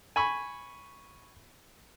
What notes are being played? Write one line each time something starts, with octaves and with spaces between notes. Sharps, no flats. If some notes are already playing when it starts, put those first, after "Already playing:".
G#5 B5 C#6